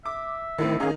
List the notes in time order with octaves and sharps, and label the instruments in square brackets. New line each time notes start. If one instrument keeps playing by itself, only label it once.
[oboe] E5 [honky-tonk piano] D6
[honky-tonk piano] A1 A2 C4 [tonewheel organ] D#3 [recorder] E4
[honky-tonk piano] D#3 D#4 [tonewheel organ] C#4 G#4 [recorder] F5